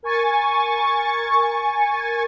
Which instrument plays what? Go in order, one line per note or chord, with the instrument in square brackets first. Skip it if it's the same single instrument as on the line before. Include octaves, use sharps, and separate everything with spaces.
[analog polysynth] A#4 G#5 C#6 A6